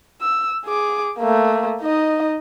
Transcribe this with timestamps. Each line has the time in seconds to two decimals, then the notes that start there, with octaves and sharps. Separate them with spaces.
0.21 E6
0.65 G#4 D6
1.19 A3 A#3
1.81 D#4 D#5